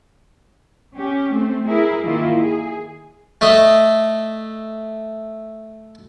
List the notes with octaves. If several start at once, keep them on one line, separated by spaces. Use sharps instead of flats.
C#4 G4
A3 C4
E4 G#4 A#4
D#3 A#3 E4 F4
G#4
A3 D#5